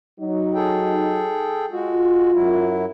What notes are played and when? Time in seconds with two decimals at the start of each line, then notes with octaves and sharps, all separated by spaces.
0.20 F#3 D#4
0.54 G#4 A4 G5
1.71 G#3 F4 F#4
2.33 F#2 F#3 E4